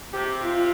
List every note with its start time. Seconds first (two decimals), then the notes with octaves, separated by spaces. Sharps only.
0.13 C3 G4
0.42 F4